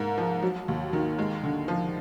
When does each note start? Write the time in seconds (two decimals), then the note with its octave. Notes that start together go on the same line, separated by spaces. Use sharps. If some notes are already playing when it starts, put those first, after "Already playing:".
Already playing: G#2 A#3
0.18 F3
0.42 F#3
0.68 D#2
0.93 D#3
1.19 G#3
1.43 D3
1.68 F3